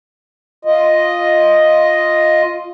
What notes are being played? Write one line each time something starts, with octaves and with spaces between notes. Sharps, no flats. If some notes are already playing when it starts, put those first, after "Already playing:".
F4 D#5